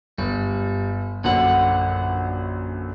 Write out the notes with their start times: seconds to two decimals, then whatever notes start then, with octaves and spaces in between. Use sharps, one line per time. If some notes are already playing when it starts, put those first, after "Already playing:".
0.18 G1 G3
1.24 A#1 F#2 D3 F#5